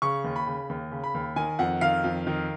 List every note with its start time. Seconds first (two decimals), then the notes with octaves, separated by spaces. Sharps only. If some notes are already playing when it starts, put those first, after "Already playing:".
0.02 C#3 C#6
0.24 D#2
0.36 B5
0.47 C#3
0.69 D#2
0.91 C#3
1.04 B5
1.14 D#2
1.36 D#3 G#5
1.59 F2 F#5
1.81 D#3 F5
2.04 F2
2.27 D#3